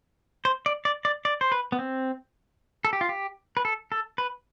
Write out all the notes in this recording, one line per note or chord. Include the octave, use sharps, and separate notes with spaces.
C5
D5
D5
D5
D5
C5
B4
B3
C4
A4
G4
F4
G4
B4
A4
A4
B4